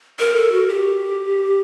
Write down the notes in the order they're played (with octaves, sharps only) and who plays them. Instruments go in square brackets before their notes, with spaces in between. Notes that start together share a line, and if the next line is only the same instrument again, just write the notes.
[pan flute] A#4
A4
F#4
G4